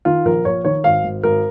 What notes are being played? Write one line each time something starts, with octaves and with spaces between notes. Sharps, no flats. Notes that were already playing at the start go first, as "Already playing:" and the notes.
D#3 F4
A#1 A#4
A#1 C#5
D#3 C#5
G#1 F5
G#1
G#1 A#4